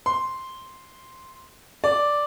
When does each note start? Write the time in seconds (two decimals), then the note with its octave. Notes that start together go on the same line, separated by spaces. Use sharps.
0.06 C6
1.84 D5